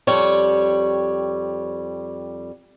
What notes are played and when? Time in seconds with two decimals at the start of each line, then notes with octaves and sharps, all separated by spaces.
0.07 F2 G3 C#5